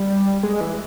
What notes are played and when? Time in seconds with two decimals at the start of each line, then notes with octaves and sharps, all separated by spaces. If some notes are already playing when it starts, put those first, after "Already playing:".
Already playing: G3
0.43 G#3
0.61 E3